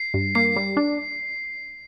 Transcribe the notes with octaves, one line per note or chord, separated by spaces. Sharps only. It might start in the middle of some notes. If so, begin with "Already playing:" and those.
Already playing: C7
G2
A#3 C7
G3
D4